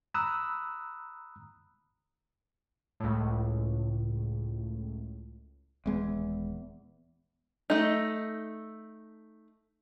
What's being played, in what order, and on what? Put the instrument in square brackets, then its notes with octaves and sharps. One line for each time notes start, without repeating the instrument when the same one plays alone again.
[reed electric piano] A#5 B5 D#6 E6 F#6
[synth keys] C#2 A2
[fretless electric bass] D#1 G#3 B3 [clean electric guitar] E2
[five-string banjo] A3 D#4